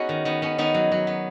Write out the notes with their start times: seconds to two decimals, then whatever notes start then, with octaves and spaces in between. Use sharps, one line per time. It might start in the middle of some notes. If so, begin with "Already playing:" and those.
Already playing: B3 C#4 D#4 F#4 G#4
0.09 D#3
0.25 D#3 B3
0.42 B3 C#4
0.58 D#3 B3 D#4
0.74 F#3
0.92 F#3
1.07 B3